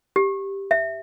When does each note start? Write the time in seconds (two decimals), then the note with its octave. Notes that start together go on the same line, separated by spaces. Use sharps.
0.16 G4
0.71 E5